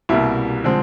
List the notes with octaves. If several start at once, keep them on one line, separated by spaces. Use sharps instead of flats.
C2 B2 G3 A#3 E4
D3 F3 G#3 C4